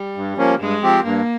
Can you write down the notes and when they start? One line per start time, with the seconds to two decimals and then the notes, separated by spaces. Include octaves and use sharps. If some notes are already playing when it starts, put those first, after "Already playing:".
Already playing: G3
0.16 G2
0.37 F3 A#3 C#4
0.59 G2 G#3
0.82 F3 C4 G4
1.04 G2 A#3